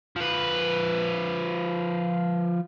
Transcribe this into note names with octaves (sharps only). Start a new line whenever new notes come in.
F3 B4